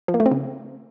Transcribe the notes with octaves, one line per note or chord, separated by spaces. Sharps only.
F3
A#3
A3
C4
C#3